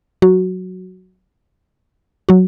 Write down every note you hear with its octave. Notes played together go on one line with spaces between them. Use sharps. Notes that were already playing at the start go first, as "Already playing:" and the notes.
F#3 F#4
F#3 F#4